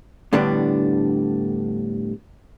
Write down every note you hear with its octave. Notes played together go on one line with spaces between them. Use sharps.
A2 D3 G3 B3 D4